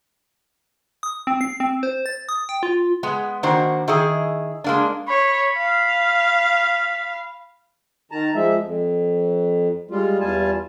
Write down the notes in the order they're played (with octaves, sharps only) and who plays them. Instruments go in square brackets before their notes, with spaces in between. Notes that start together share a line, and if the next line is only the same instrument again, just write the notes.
[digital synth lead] D#6
C4
C7
C4
C5
A6
D#6
G5
F4
[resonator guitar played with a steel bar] G#3 B3
D#3 A#3 D4 F#4 C5
D#3 E4 G#4 D#5
G#3 A#3 D4
[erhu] C#5 [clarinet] B5
[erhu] F5
[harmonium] D#3 A5 A#5
F3 G#3 E5
F2
G3 G#3 F4
E2 G3 F4 G#5 A5